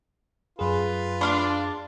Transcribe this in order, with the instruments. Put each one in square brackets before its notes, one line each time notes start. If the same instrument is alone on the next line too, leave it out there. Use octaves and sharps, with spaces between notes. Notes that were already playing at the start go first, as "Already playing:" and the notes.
[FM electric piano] F#2 G#4 [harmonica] F4 B4
[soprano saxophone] D4 [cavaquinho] D5 F5 C6